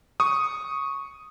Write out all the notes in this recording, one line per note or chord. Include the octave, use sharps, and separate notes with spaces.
C#6 D#6